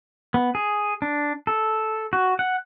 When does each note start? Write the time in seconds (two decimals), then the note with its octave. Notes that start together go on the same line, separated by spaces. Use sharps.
0.34 B3
0.55 G#4
1.02 D4
1.47 A4
2.13 F#4
2.39 F#5